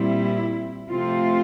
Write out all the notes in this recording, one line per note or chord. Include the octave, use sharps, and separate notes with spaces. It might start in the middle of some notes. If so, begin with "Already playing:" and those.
Already playing: A#2 G3 C4 E4
C3 F3 A3 C4 F4